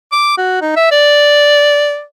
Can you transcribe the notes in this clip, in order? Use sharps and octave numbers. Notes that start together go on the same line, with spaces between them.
D6
F#4
D#4
E5
D5